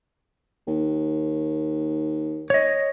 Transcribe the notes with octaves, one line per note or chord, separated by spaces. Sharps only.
D#2
C#5 D#5